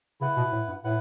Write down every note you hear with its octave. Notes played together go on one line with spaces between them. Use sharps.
C#3 E4 B4 F#5
B2
A2
G2
A2 E4 B4 F#5